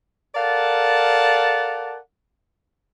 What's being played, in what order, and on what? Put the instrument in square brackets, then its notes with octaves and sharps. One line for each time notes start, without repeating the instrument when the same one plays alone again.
[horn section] A4 A#4 D5 F5 F#5 A5